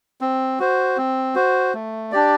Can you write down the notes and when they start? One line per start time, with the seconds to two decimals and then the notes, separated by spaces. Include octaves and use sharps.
0.21 C4
0.60 F#4 C5
0.97 C4
1.35 F#4 C5
1.74 A3
2.12 D4 G4 D5